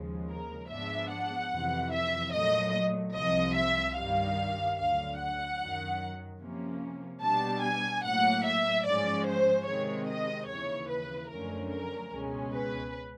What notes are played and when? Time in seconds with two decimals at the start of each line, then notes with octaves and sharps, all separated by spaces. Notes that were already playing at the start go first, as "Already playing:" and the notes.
Already playing: D#2 C#3 F3 G#3
0.29 A#4
0.69 G#2 F3 G#3 B3 D4 E5
1.11 F#5
1.50 F2 C3 E3
1.92 E5
2.32 A#2 F#3 A3 D#5
3.14 C2 C3 F3 D#5
3.55 E5
3.95 G2 D#3 G3 F5
4.77 D2 D3 F#3 F5
5.18 F#5
5.59 F#2 D#3 F#3
6.40 C3 F3 A#3 C#4
7.21 B2 G3 B3 D4 A5
7.63 G#5
8.03 A2 F#3 A#3 F#5
8.44 E5
8.85 G#2 F3 G#3 C#4 D5
9.26 C5
9.66 C3 D#3 G#3 C4 C#5
10.07 D#5
10.47 D#2 C#3 E3 C#5
10.89 B4
11.30 F#2 D3 F3 A3 C#4 A#4
11.70 A#4
12.11 C#2 B2 G#3 C#4
12.52 B4